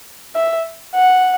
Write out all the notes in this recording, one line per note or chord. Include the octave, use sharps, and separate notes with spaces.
E5
F#5